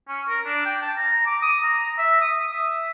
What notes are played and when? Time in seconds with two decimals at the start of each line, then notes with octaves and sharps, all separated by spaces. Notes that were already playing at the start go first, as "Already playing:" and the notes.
0.08 C#4
0.28 A#4
0.46 D4
0.65 G5
0.82 A5
0.96 A#5
1.26 D6
1.42 D#6
1.63 A#5
1.98 E5
2.20 D#6
2.53 E5